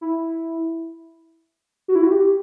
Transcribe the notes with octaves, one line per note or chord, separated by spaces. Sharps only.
E4
F#4
E4
F#4
G4